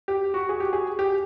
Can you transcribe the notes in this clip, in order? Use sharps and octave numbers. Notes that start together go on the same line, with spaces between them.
G4
F#4
G#4
G4
G#4
G4